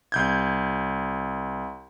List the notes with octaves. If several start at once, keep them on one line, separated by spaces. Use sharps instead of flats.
C2 G6 G#6